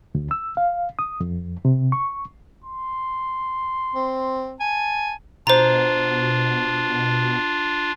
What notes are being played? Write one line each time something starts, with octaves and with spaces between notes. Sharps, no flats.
D2
E6
F5
D#6
F2
C3
C#6
C6
C4
G#5 A5
B2 D4 F4 C5 A#5